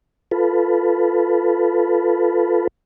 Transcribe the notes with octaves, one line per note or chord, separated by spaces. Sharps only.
F4 A4 B4